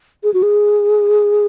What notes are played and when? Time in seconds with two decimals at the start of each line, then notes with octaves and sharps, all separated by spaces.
0.24 G#4
0.34 F#4
0.43 G#4